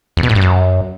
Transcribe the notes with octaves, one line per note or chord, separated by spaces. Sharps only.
E2
B2
A2
G2
F#2